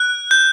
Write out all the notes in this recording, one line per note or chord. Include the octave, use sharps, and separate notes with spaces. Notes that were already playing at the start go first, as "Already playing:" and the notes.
Already playing: F#6
G6